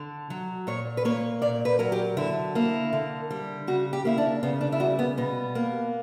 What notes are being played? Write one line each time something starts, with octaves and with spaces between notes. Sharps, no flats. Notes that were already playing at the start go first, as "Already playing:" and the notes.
Already playing: D3
F#3
A#2 C#5
B4
A#3 C#5
A#2 D5
B4
F#3 A#4
G4
D3 E4
A#3 E4
D3
G3
C#3 F#4
G4
A#3 E4
D4
C#3 B3
D4
E4
G3 F#4
B3
B2 B3
A#3